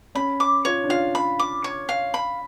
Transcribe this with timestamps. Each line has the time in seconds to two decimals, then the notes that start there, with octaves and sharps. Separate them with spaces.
0.15 C#4 B5
0.40 D6
0.65 F4 C#5
0.84 D4
0.89 F4 F5
1.15 B5
1.39 D6
1.64 C#5
1.89 F5
2.14 B5